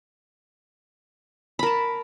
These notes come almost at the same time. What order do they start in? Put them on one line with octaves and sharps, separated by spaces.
B5 A#4 A5